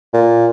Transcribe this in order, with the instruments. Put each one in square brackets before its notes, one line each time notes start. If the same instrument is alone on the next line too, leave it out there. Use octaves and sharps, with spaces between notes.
[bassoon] A#2